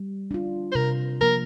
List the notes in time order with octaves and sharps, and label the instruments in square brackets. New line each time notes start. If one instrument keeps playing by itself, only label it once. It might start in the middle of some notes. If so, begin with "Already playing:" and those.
Already playing: [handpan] G3
D4 F4
[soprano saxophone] C5
[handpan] C3 [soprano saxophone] A#4
[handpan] F3 A#3 [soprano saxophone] A#4